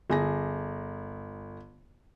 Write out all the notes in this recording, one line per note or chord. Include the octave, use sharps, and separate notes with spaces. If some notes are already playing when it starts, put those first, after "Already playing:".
G1 G#4 A#6